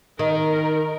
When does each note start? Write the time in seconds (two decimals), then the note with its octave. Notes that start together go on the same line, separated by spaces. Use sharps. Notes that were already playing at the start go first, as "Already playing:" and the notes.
0.19 D#3 A#4